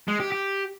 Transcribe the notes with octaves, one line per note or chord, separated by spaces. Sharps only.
G#3
G4
G4